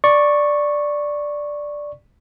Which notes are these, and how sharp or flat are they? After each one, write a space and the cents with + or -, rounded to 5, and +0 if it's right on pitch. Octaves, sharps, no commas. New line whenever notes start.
D5 +0 C#6 -10